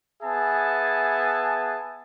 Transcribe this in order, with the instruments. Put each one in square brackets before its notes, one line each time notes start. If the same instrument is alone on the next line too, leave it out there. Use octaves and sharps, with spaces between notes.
[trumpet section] B3 G#4 E5 G#5 A5